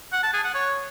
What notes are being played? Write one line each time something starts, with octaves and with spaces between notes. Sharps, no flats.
F#5
A5
G#4
F#5
C#5